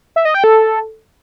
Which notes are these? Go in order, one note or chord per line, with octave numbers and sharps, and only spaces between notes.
E5
D#5
G5
A4